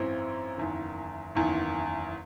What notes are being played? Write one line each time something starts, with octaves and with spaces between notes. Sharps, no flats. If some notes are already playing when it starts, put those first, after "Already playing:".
Already playing: G#1 F#2 E3 C4 E4
F#1 E2 D#3
F#1 E2 D#3